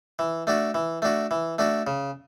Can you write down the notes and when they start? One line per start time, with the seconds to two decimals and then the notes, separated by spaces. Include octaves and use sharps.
0.19 E3
0.47 A3 D4 F#4
0.74 E3
1.02 A3 D4 F#4
1.31 E3
1.59 A3 D4 F#4
1.87 C#3